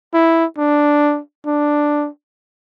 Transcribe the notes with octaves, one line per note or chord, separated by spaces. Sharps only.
E4
D4
D4